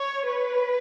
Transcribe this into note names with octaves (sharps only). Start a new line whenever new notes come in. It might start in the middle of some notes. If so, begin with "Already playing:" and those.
Already playing: C#5
B4